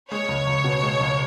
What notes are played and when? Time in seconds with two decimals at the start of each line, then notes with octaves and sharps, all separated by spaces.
0.11 G#3 C#5
0.29 C#2
0.47 C#2
0.64 B2
0.83 G#3
1.00 C#2